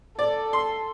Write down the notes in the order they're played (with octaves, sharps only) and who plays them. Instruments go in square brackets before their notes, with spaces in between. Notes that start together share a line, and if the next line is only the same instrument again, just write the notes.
[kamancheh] A4 [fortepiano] D5
[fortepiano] C6